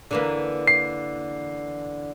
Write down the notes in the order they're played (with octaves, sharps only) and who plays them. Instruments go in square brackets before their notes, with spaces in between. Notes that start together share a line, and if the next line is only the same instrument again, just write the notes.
[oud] D3 E3 A#3
[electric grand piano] C7